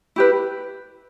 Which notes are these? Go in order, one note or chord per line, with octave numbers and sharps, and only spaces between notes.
E4 G4 B4